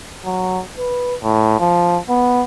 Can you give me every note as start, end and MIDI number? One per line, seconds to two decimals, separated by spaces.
0.24 0.61 54
0.78 1.15 71
1.23 1.58 45
1.59 1.97 53
2.09 2.43 59